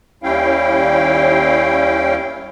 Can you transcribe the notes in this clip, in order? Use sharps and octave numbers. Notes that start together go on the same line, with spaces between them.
D#2 G3 C#4 E4 F5 G5